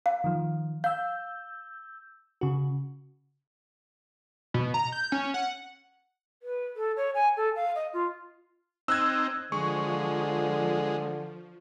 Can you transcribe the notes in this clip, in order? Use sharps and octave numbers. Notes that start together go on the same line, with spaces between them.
F5
D#3 F3
F5 E6 G6
C#3 F#4
B2
A#5
G6
C#4
F#5
B4
A4
C#5
G#5
A4
F5
D#5
F4
C4 D#4 E6 F#6 G#6
D3 F3 G#3 C#6